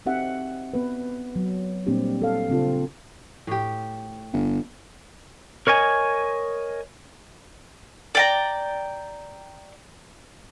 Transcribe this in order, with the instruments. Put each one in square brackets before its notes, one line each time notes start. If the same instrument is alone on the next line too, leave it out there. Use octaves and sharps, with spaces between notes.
[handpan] C4 D#4 G4 E5 F#5
B3 B4
F#3
A#2 G3 A#3 C4 D4 G4
A4 F5
C#3 C4 D4 F4 A4
[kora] A2 G4
[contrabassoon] G1
[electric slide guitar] A#4 C#5 D#5 G#5
[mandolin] D5 G5 A#5